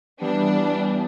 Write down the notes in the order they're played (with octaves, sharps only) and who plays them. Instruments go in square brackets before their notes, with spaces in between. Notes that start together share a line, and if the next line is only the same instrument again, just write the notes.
[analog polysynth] E3 G3 B3 [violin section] D4